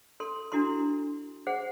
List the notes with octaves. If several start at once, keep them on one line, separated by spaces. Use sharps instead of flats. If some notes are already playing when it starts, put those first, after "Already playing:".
A4 C6
D4 E4 F#4 A4 C6
G#4 C5 F#5